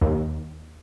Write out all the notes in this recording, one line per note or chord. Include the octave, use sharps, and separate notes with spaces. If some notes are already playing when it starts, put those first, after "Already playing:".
D#2